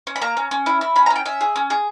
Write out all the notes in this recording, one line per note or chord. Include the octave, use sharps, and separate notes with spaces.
C#4
B5
A#3 A#5
C#4
C#4
E4
E4
C#4 B5
A#5
C#4
G5
C#4 E5
G#4
C#4
G#4